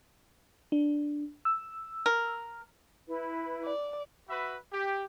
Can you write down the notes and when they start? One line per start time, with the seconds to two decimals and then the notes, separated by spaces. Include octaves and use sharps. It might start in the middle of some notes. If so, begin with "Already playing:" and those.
0.72 D4
1.45 E6
2.06 A#4
3.07 E4 B4
3.64 D5
4.29 F#4 B4 E5 B5
4.72 G4